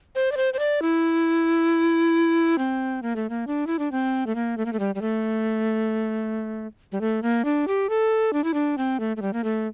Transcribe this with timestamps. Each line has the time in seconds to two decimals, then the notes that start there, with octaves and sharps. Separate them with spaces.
0.15 C5
0.32 D5
0.37 C5
0.53 C5
0.59 D5
0.82 E4
2.58 C4
3.02 A#3
3.16 A3
3.30 A#3
3.47 D4
3.67 E4
3.79 D4
3.92 C4
4.27 A3
4.35 A#3
4.57 A3
4.66 A#3
4.73 A3
4.79 G3
4.95 G3
5.01 A3
6.92 G3
7.01 A3
7.23 A#3
7.45 D4
7.68 G4
7.89 A4
8.33 D4
8.44 E4
8.54 D4
8.78 C4
9.00 A3
9.17 A3
9.22 G3
9.33 A#3
9.44 A3